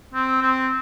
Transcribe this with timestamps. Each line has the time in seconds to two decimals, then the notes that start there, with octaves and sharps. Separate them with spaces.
0.14 C4
0.42 C4